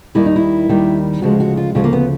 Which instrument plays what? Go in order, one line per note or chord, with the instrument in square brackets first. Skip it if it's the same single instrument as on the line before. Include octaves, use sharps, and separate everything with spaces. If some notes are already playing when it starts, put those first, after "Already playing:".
[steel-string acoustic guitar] D#2 D#3 G3 E4
D#4
E4
D#2 D#3 G3
D2 C#3 F3 G#3 F#4
F#4
F4
D2 C#3 F3 G#3 F4
A#3
B3